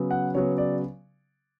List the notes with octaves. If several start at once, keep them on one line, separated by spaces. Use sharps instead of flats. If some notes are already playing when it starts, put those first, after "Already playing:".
Already playing: C#3 F#3 B3
F#5
C#3 F#3 B3 C#5
D5